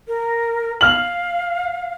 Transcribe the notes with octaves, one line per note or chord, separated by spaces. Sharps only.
A#4
F5 F6 F#7